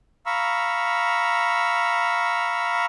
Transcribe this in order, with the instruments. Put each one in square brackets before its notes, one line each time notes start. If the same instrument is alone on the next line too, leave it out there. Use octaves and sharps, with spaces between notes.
[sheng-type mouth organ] F5 A#5 B5 C#6 E6